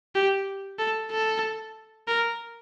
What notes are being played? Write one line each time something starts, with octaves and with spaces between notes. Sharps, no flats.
G4
A4
A4
A#4